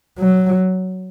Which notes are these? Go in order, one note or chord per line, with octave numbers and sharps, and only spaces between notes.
F#3